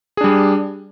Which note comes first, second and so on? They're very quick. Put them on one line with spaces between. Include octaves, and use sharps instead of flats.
G#4 D4 G3